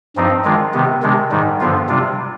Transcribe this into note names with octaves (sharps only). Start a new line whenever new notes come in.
G2 F3 C4 D#4
D#3 G#3 D4 F4
C3 D#3 B3
C3 D#3 G#3 D4
G#2 D#3 G3
G2 D3 F3 B3 F4
C3 G3 D4 F4